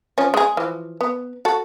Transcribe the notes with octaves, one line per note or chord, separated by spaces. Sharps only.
F3 C#4
G#3 G#4
E3 F3
B3
F#4 A4